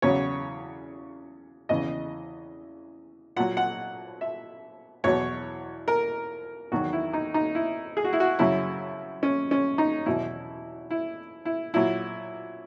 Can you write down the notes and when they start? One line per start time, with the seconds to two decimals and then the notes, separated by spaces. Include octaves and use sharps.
0.02 E2 C#3 F#3 C#5
1.69 E2 C#3 E3 D#5
3.37 A#2 F#3 F#5
3.57 F#5
4.21 E5
5.04 E2 B2 F#3 C#5
5.88 A#4
6.72 E2 D#3 F#3 F#4
6.93 E4
7.13 D#4
7.34 D#4
7.55 E4
7.97 G#4
8.05 F#4
8.13 E4
8.20 F#4
8.39 F#2 C#3 F#3 E4
9.23 C#4
9.51 C#4
9.78 D#4
10.06 E2 B2 F#3 E4
10.91 E4
11.45 E4
11.74 A#2 F#3 E4